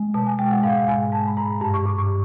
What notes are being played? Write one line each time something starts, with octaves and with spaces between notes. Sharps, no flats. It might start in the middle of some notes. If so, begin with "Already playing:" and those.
Already playing: G#3
B2 A5
G#5
G#3 G5
F#5
G#2 F5
G#2 G#5
G#3 A5
B5
G#2 A#5
G2 A5
C#6
G2 D6
C#6